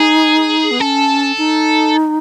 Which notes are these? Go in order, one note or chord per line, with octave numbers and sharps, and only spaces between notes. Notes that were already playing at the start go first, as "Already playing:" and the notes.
Already playing: D#4 G#4
B3
C#4 A4
D#4